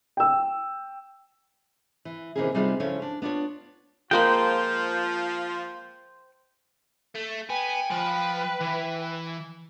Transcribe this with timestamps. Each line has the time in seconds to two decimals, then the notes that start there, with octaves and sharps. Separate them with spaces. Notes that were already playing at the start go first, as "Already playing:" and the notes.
0.17 G5 E6
2.05 E3
2.36 C3 D#3 E3 A#3 C#4 G#4
2.54 C3 G3 B3 D#4 F4 G#4
2.80 C#3 F3 C#4 E4 A4 C#5
3.02 D4
3.22 B3 D4 F4 C#5
4.11 F3 G#3 A#3 F4 C5 G5 B5
7.15 A3
7.50 B3 G5 G#5
7.91 F3 B4
8.61 E3